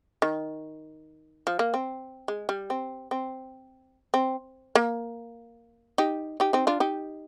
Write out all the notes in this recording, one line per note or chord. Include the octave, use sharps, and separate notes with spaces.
D#3
F3
A#3
C4
G#3
G3
C4
C4
C4
A#3
D#4 G4
D#4 G4
C4 D#4
D4 F4
D#4 G4